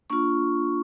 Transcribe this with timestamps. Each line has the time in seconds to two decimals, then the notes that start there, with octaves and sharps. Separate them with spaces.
0.10 A#3 D4 F4 C#6